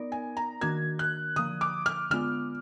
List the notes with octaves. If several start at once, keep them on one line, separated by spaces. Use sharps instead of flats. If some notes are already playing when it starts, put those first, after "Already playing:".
Already playing: B3 D#4 A#4 D5
G#5
A#5
D#3 A#3 D4 F#4 A#4 G#6
F#6
D3 F3 A#3 D#6
D6
F6
D3 G#3 B3 F4 F6